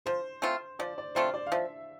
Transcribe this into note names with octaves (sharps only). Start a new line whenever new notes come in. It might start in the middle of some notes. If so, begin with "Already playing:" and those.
F3 C5
A3 C4 F4
F3 D5
D5
A3 C4 F4 C5
D5
F5
F3 E5